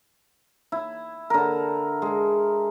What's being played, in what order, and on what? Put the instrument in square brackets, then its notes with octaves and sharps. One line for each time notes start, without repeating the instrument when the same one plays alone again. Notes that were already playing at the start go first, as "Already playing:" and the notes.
[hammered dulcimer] E4
D3 A#4
G#3